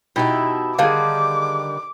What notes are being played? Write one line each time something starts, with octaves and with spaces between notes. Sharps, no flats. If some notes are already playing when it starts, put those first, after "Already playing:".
B2 D#4 E4 G4
D3 D#3 G3 G#4 F5 D6